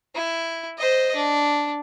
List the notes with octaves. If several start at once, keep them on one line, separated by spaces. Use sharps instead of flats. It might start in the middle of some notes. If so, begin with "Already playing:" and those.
E4
C5 D#5
D4